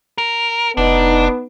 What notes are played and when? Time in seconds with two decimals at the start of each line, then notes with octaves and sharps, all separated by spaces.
0.18 A#4
0.77 F1 B3 D4 D#4